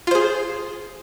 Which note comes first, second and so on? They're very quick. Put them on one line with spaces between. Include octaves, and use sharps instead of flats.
F4 C5 G#4